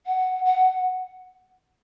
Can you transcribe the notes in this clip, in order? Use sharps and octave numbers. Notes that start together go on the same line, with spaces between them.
F#5
F#5